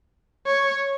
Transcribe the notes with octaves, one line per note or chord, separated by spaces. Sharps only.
C#5